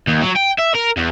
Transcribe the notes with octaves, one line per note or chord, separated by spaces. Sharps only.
D#2
F#3
G5
E5
A#4
E2